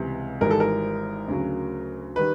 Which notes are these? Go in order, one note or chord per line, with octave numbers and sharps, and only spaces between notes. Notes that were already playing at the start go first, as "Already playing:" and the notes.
Already playing: C#2 C3 E3 G3
G#1 G#2 E3 G3 A#4
A4
A#4
D2 C#3 F#3
D#3 G3 B4